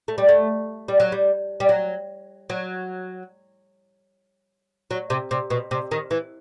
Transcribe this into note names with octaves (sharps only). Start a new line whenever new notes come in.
A3
G3
A3
G3
F#3
G3
G3
F#3
F#3
F#3
C3
C3
B2
C3
D#3
E3